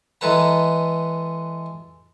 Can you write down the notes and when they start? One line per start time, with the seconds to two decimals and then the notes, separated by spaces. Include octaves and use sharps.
0.21 E3 G#3 A4 B4 A#5